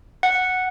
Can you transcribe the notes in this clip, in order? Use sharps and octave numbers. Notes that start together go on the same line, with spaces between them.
F#5